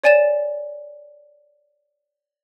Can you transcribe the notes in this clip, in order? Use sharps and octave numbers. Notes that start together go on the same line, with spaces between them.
C#5 D5 G#5 A6 E7